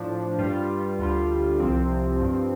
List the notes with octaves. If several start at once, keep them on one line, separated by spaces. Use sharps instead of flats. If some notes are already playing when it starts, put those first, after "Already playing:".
Already playing: A2 F3 D4
G2 G3 F4
D2 D3 G3 F4
C2 C3 F3 C4
G2 F3 C4